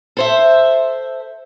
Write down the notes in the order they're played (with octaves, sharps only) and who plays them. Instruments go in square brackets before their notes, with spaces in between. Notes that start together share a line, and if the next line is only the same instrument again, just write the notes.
[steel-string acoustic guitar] A4 C5 E5